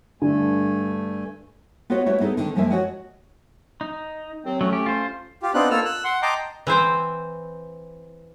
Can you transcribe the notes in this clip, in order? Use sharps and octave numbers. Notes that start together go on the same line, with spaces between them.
G2 D3 A3 G#5
B3 F4 F#4 C#5 D#5 F#5
A3 B3 E4 F#4 C#5
B3 D#4 E4 G#4 A4
D3 D#3 A3
F#2 F3 G#3 A#3 E5 G#5
F#4 G4 C#5 D#5 F#5 G#5
D#4
D#2 F#3 C4
F#3 A3 C#4
G4
F4 C5
F4 G4
B3 C4 D4 D#4 F4 F#6
A#3 F4 A4 E6 F6
E6 F#6
F#5 C6
D#5 G5 A5 A#5 C6 D6
E3 C4 C5 G5